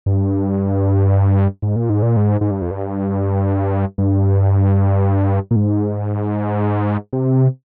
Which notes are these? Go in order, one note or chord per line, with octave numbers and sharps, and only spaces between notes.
G2
G#2
A#2
G#2
A#2
G#2
G#2
G2
F2
G2
G2
A#2
G#2
C3